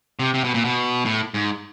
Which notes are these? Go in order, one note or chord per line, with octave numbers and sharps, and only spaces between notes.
C3
C3
B2
A#2
B2
A2
G#2